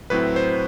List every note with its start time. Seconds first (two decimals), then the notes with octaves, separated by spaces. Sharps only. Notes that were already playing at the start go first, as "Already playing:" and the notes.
0.10 A2 F#3 C4 E4 B4
0.36 C5